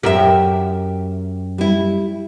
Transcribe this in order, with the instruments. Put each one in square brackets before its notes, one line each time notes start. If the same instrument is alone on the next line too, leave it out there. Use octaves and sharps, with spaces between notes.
[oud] F#2 G4 [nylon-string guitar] A#4 E5
[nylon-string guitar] G3 E4